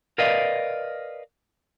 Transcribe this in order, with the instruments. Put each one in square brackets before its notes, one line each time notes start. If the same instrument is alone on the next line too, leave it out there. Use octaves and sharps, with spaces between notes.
[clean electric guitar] A#4 B4 D5 D#5 F5